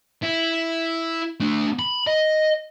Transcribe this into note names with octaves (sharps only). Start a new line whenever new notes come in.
E4
A3 D4
B5
D#5